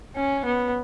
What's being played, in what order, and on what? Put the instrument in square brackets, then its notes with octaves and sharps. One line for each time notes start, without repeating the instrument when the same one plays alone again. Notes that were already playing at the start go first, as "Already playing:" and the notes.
[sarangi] C#4
B3